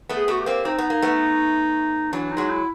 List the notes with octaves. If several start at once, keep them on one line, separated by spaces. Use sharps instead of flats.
A3 B3
G#4
A3 B3 F#4
G4
A#3 C4
C4 D#4
B3
A#3
A3 B3
E3 F#3 D4
D#4
F#3 G#3
E4